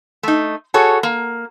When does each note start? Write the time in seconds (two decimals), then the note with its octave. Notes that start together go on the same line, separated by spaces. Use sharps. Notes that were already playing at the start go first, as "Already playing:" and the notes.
0.23 A3 D#4
0.74 F#4 G#4 A4 C#5
1.03 A#3